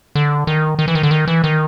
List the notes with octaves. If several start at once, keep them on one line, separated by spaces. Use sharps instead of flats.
D3
D#3
D#3
E3
D#3
D3
D#3
E3
D#3